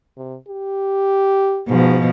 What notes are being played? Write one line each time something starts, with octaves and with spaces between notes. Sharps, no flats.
C3
G4
G#2 B2 F3